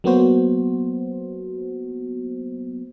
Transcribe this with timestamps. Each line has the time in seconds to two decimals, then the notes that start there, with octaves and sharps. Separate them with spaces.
0.04 F#3 A#3 B3 F#4 C5